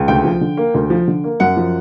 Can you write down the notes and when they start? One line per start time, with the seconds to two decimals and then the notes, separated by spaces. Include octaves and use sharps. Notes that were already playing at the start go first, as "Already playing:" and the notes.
Already playing: C#2
0.08 D2 G5
0.25 F3
0.41 D3
0.57 A#3
0.75 D2
0.90 F3
1.08 D3
1.24 A#3
1.40 F#2 F#5
1.57 F3